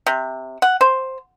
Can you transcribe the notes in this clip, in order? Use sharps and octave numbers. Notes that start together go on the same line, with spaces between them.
C3
F#5
C5